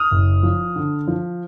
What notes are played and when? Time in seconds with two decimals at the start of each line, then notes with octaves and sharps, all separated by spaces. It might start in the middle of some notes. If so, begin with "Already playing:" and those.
Already playing: D#6 F6
0.11 F#1
0.43 F3
0.76 D3
1.08 F3